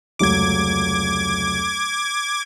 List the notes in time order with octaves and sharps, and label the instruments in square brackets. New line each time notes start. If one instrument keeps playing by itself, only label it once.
[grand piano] F1 C#2 F#3 [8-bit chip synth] D6 G#6